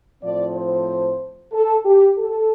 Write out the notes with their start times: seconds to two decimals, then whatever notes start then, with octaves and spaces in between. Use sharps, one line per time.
0.22 A2 F3 C4 D5
0.55 C5
1.53 A4
1.85 G4
2.18 A4